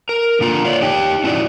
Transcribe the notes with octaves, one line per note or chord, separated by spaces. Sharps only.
A#4
D3 A#3 F4 A#5
C#5 D5 F5
D#4 G4 G5
C#4 E4 F#4 D5